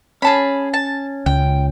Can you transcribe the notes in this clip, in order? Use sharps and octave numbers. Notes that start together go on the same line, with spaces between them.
C#4 G#4 A5 B5
A5
C#2 G5